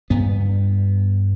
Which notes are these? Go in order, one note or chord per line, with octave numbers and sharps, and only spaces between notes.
G2 B3